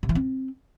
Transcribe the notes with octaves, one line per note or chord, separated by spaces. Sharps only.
C3
E3
C4